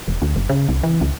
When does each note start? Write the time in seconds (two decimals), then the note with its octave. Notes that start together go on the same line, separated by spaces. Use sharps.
0.08 E1
0.22 D2
0.36 F#1
0.49 C#3
0.69 C2
0.83 E3
1.01 C#2